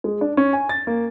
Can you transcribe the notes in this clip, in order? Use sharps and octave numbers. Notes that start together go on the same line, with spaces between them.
G#3
D4
C#4
G#5
A6
A#3